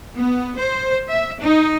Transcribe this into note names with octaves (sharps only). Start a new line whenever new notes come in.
B3
C5
E5
D#4